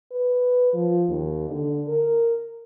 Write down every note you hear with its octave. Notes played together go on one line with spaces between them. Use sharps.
B4
F3
D#2
D3
A#4